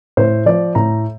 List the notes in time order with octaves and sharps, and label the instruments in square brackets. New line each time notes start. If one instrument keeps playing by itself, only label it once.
[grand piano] A2 C5
F3 D5
A2 A#5